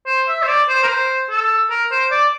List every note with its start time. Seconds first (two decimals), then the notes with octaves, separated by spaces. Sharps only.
0.07 C5
0.28 E5
0.43 C5
0.48 D5
0.69 C5
0.83 A#4
0.88 C5
1.30 A4
1.70 A#4
1.91 C5
2.11 D5